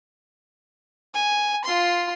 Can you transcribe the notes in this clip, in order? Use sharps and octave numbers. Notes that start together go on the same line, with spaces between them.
G#5
F4 C6